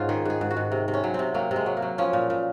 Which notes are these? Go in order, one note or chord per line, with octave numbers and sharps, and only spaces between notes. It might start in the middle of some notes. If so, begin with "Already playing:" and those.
Already playing: G#2 C#4 D#4 F4
D#3 G#4
G#2 G#4
G#2
F#4
G#2
C3
C3
C#4
F#3
C3 C4
F#3 A#3
C3
G#3
F#3
A#3
F#3
F3 C#4
A#2
A#2